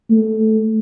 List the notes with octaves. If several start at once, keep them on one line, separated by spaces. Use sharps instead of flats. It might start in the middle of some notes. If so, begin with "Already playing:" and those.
A3